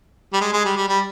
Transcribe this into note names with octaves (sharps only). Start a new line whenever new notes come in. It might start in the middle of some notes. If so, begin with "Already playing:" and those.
G3
G#3
G#3
G3
G3
G3